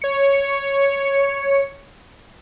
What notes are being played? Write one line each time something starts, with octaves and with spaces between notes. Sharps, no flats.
C#5 C#7